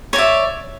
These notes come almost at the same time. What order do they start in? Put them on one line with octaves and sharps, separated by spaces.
C#5 D5 E5